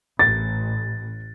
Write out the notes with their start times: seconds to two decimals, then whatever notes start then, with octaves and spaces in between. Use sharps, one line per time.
0.19 A1 A6